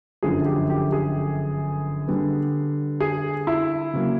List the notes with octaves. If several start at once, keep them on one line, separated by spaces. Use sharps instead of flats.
G1 F#2 D3 F3 G#4
G4
G4
G#4
D3 G3 B3
G#4
E4
C#3 F#3 A#3